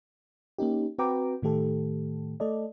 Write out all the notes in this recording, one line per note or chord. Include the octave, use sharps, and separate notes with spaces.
A#3 C#4 D#4 G4
C4 F#4 B4 G5 A#5 D6
A2 D#3 A3 G4 A4
A3 A4 D5 D#5